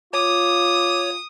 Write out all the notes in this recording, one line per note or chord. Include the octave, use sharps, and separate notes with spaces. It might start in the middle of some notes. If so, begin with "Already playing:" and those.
F4 C#5 D6 D#6